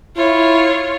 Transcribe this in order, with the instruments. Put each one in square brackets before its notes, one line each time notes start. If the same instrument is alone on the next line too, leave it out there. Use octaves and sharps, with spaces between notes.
[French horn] E4 [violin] F4 C#5